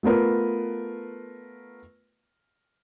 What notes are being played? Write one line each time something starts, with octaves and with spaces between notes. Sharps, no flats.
A3 B3 F4 A#4 B4